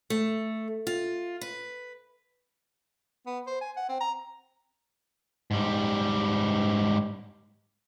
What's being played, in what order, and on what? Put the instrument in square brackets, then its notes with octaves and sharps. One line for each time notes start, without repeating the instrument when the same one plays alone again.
[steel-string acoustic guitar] A3
F4
B4
[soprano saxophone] B3
C5
G#5
F#5
C4
A#5
[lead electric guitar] G#2 G3